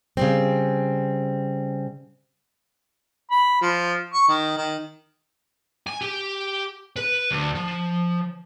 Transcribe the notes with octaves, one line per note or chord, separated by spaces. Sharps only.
C#3 G3 C4
B5
F3
C#6
D#3
D#3
G#5
G4
B4
D2
F3